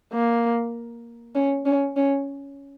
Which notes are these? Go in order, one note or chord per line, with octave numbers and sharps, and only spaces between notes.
A#3
C#4
C#4
C#4